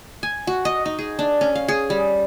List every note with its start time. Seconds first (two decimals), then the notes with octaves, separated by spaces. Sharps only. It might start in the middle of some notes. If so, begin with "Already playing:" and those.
0.23 G#5
0.47 F#4
0.65 D#5
0.86 D#4
0.99 G#4
1.19 D4
1.41 C#4
1.55 F5
1.68 G#4
1.90 G3